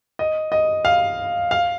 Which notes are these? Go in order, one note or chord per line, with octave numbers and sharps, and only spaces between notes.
D#5
D#5
F5
F5